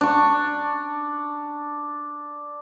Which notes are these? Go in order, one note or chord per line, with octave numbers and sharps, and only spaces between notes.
D4 C#6